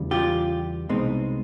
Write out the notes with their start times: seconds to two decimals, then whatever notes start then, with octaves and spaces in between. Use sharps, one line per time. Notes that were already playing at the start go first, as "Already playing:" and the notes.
Already playing: E2 C#3 E3 G3
0.11 F4 G4
0.89 C2 B2 G#3 C4 D#4